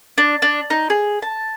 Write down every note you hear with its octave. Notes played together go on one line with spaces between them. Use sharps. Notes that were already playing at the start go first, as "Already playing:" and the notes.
D4
D4
D#4
G#4
A5